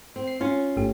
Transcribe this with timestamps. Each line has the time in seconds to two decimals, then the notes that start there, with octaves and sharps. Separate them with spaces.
0.16 C4
0.28 C7
0.41 C#4 F4
0.76 G1 A3 G4